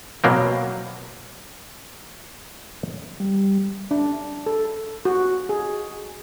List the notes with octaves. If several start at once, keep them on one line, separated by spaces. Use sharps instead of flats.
B2 F#3 A#3 C4
G3
D4
A4
F#4
G#4